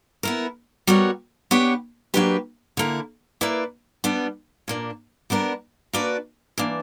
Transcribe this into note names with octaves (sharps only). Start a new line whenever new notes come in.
B3 E4 A#4
G3 B3 F#4 A#4 C#5
B3 D4 G4 C#5
F#3 A#3 D4 G4 B4
D3 A#3 E4
A#3 E4 B4 D5
G3 B3 D4
A#2 A#3 D4
G3 B3 D4 A#4
A#3 D4 F#4 B4 D5
E3 A#3 D4